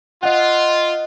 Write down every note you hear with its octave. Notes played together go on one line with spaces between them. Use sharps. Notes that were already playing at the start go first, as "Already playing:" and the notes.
F4 D#5 F#5